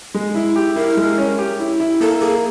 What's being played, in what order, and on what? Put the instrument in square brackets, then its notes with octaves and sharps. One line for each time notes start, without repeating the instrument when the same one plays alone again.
[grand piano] G#3
E4
G4
[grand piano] E4 [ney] A#4
[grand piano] G#3
C#4
G4
E4
E4
[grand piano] A#3 [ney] A4
[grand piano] A#3 [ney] G#4